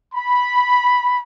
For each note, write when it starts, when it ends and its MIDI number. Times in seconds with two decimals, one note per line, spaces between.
0.14 1.23 83